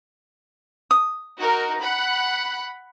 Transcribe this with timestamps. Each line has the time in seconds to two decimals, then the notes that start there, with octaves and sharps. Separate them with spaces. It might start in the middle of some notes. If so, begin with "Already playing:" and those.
0.91 D#6
1.39 D#4 F#4 A#4
1.80 F#5 B5